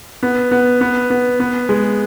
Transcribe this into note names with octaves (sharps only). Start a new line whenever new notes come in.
B3
B3
B3
B3
B3
G#3